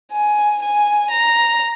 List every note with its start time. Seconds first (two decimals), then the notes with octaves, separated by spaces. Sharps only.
0.13 G#5
0.62 G#5
1.11 A#5